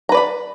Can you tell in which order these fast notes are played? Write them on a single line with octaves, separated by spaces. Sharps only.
A#5 B4 D5 B5